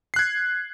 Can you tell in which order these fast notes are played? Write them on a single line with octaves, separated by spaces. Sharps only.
C7 F#6 G#6